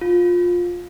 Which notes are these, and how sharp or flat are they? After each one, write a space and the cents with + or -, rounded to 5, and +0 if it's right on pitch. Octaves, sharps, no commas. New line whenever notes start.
F4 +20